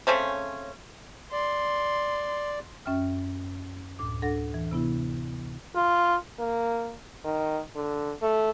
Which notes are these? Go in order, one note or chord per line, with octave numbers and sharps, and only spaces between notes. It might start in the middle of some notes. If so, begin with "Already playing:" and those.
C#3 A3 C4 C#4
D5 C6
F#2 C#4 E5 G5 F6
D2 A2 D6
D4 A4 F#5 A#6
E3
C3 B3 E4
F4
A#3
D#3
D3
A3